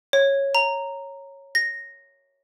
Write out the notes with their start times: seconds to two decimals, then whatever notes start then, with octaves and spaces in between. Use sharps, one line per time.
0.13 C#5
0.55 A#5
1.55 A#6